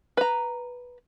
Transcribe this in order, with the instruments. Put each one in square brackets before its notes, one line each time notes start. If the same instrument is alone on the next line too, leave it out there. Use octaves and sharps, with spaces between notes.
[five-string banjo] B4 A#5